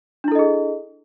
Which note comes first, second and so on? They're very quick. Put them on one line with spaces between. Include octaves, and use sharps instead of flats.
D4 E4 A4 D#5 G#4